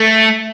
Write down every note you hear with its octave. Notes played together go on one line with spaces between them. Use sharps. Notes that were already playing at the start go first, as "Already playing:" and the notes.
Already playing: A3